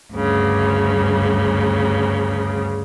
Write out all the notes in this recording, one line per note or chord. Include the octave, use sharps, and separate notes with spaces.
D2 G2 C#3